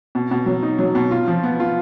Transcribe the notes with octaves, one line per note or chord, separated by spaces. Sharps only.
B2
B2
F#3
D#4
F#3
B2
F4
F3
B3
F4